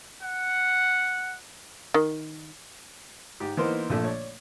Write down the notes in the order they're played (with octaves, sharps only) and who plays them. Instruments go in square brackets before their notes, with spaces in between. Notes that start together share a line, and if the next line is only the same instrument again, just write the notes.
[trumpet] F#5
[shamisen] D#3
[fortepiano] G#2 G4
E3 A#3 B3 D#4 A#4 C5
A#1 A#2 D3 F3 A3
C#5 D5